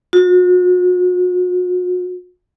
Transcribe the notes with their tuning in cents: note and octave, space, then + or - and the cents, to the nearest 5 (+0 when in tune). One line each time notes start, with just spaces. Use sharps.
F#4 -40